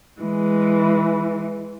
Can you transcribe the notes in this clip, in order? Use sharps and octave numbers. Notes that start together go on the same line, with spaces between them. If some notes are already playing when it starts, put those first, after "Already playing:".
E3 G#3